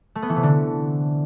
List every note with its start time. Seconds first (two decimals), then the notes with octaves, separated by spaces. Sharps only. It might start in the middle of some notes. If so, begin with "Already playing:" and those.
0.15 A3
0.22 B3
0.29 E3
0.36 C3
0.43 D3